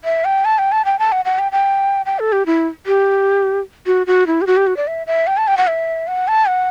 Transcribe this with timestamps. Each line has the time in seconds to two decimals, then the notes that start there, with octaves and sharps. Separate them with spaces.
0.05 E5
0.25 G5
0.45 A5
0.58 G5
0.72 A5
0.85 G5
0.99 A5
1.12 F#5
1.25 F#5
1.39 G5
1.52 G5
2.06 G5
2.19 A4
2.32 G4
2.46 E4
2.87 G4
3.87 F#4
4.07 F#4
4.27 E4
4.41 G4
4.47 F#4
4.57 G4
4.67 F#4
4.77 D5
4.87 E5
5.07 E5
5.27 G5
5.37 A5
5.47 G5
5.57 F#5
5.67 E5
6.08 F#5
6.28 A5
6.48 F#5